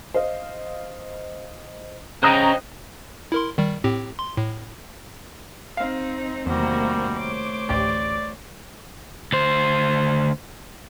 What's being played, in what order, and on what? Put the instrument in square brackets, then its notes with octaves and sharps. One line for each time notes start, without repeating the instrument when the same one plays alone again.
[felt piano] C5 D#5 F5
[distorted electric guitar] C#3 [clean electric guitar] C5 D#5 G5 [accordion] A#5 [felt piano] D#6 F#6
[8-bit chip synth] E4 A#4 C6
D#3 G3
A2 C4 G4
C6
A2
[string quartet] C4 D#4 [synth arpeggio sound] F5
[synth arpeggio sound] E2 [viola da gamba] C3 D#3 A3 [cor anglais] G3 [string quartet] A#3 F#4 C5
[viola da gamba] A3 C5 C#5 [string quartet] D6
[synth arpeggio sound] A1 D2 G4 [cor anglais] D5
[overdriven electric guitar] D2 C5